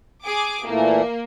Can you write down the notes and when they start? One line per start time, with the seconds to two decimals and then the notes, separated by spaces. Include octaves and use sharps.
0.24 G#4 D6
0.66 A#2 E3 A3 A#3